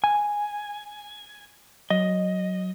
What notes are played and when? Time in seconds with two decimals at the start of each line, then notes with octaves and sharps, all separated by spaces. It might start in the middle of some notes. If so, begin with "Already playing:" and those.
0.04 G#5
1.90 F#3 D#5